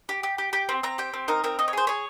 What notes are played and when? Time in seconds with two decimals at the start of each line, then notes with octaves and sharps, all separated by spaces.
0.09 G4
0.23 G4
0.38 G4
0.53 G4
0.69 C4
0.83 C4 A#5
0.98 G4 G5
1.14 C4
1.28 D#4 A#4
1.44 C4 A#4
1.59 D#4 D#5
1.68 C#5
1.73 G#4 C5
1.87 G#4 C#5